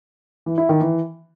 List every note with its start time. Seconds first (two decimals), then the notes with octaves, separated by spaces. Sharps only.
0.46 E3
0.58 E4
0.69 D#3
0.81 E3